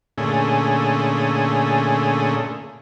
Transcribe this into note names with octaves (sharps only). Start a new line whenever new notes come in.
A#2 D3 A3 C#4 G#4